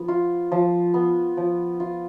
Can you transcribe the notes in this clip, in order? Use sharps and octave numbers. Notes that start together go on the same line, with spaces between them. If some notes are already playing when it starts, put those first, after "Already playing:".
Already playing: F3 B3
F4
F3
B3
F3
F4